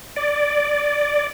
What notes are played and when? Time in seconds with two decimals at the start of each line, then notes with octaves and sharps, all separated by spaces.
0.16 D5